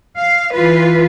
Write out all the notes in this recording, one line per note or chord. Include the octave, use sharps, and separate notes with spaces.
F5
E3 F4 B4